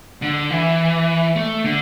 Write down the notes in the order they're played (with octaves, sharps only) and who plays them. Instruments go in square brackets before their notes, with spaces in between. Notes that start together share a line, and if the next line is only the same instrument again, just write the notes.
[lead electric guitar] D3
E3
A3
D3